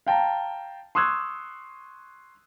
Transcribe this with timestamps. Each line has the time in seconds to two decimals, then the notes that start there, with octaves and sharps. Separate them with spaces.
0.06 F5 G5 A5 A#5
0.95 C6 C#6 D#6 E6 F#6 G#6